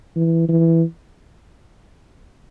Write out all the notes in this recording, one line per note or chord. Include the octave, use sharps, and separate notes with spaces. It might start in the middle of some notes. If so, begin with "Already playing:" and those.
E3
E3